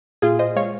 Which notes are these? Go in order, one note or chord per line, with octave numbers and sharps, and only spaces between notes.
A#2 F4 G#4
C5 D#5
G#3 C#5 F5